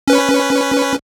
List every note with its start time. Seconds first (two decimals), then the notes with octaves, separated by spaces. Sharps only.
0.08 C#4 B4